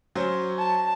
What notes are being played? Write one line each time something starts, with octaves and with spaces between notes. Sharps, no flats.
F#3 C#4 C5
A5